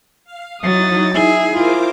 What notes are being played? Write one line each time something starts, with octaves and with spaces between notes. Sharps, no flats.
F5
F#3 D#4 E4 D#6 A6
G#4 E5
E4 F4 A#4 C5 D6